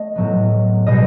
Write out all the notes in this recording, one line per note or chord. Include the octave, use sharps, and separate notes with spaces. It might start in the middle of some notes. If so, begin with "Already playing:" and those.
Already playing: A3 D#5
A2 F#3 B3
B2 G3 D#5